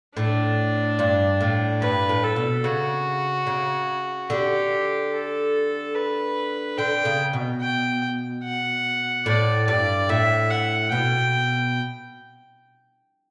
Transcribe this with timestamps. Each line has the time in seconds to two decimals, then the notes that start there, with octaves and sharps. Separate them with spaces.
0.17 A2 D4
0.99 G2
1.41 A2
1.82 G2 B4
2.09 A2
2.23 A4
2.36 B2
2.64 C#3 F#4
3.47 C#3
4.30 D3 G4
5.12 A4
5.95 B4
6.77 D3 G5
7.05 C#3
7.33 B2
7.61 G5
8.44 F#5
9.25 A2 D5
9.67 G2 D5
10.09 A2 E5
10.50 F#5
10.91 B2 G5